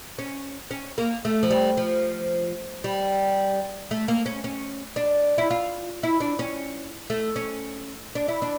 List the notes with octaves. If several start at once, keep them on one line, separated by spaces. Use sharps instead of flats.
C#4
C#4
A#3
A3
F3
G3
F3
G3
A3
A#3
C#4
C#4
D4
E4
F4
E4
D4
C#4
A3
C#4
D4
E4
D4